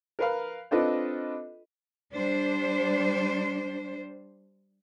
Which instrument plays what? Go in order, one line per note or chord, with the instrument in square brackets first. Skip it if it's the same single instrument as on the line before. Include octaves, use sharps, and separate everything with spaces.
[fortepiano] A#4 B4 F5
C4 D4 F4 A4 B4 D#5
[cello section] G3 D4 C5